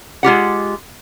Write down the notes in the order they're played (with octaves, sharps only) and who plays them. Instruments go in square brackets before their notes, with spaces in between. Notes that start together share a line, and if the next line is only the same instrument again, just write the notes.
[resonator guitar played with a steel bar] G#3 F4 G4 F#5